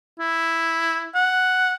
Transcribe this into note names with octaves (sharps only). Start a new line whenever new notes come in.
E4
F#5